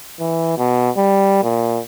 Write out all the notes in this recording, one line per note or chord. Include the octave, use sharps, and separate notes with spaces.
E3
B2
G3
A#2